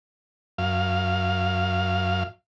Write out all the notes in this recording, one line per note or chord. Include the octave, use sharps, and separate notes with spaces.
F#2 F5